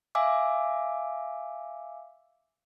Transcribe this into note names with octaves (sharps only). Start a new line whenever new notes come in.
E5 F5 G#5 D6 E6